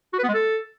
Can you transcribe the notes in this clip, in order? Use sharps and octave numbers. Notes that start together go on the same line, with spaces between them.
F#4
B4
B3
G#3
A4